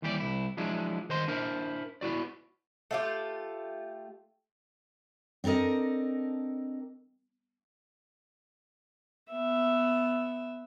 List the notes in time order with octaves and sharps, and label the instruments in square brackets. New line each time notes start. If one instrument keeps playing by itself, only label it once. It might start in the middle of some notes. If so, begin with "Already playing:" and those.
[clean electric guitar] D#2 E3 G3 G4 A4 D5
C2 E4
F3 F#3 G#3 D4 E4
D#3 C5 D#5 C6
D4 E4 A#4 C5
B3 E4 F#4 D5
[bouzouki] A3 F4 G4
[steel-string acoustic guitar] C4 D4 A4 A#4 D#5
[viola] B3 E5